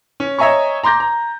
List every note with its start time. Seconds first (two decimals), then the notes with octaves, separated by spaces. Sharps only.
0.20 C#4
0.39 C#5 D#5 E5 G#5 A#5 C#6
0.83 A#5 C6 D6 G6 A#6
1.00 A#5